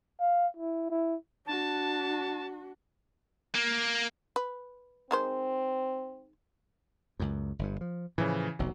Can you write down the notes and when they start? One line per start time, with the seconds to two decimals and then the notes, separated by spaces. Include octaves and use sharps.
0.20 F5
0.57 E4
0.90 E4
1.47 D4 F#4 A5
3.55 A#3
4.36 B4
5.11 D#3 G#3 C4 C5
7.20 C#2 F#2
7.59 G1 G2
7.81 F3
8.18 A2 C#3 E3 F3
8.59 F1 B1 F#3